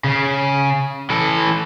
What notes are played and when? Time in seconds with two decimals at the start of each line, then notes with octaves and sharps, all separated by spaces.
0.04 C#3
1.10 E3 A4